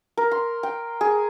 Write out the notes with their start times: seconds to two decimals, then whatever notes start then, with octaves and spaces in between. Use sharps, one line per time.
0.17 A#4
0.31 C6
0.63 G5
1.01 G#4